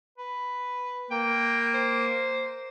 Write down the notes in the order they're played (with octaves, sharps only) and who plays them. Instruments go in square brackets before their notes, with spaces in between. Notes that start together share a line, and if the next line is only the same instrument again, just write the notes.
[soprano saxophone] B4
[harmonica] A#3 [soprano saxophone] G5
[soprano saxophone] C5